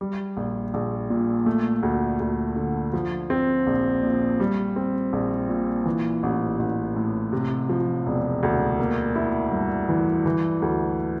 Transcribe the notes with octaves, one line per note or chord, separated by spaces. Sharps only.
G3
A#1
A#1
A#2
A3
D2
D2
D3
F3
C4
A#1
A#2
G3
C4
A#1
A#2
E3
A1
A1
A2
C3
F3
E1
D2
A#3
E4
G2
E3
E3
D2